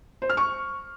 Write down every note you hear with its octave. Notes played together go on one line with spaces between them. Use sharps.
C5
F6
C#6